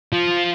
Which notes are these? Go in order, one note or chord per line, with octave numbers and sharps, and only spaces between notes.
F3